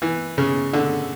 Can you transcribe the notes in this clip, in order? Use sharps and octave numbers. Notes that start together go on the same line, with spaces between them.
E3
C#3
D3